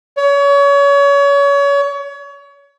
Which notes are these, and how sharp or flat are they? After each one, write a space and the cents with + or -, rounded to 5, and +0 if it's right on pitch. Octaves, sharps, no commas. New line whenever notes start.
C#5 +30